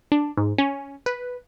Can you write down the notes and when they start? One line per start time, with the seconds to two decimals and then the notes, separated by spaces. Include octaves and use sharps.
0.12 D4
0.37 G#2
0.58 C#4
1.06 B4